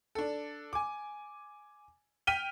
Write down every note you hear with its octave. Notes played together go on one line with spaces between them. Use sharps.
D4 A4
G#5 D6
G5 F6 B6 D#7 G7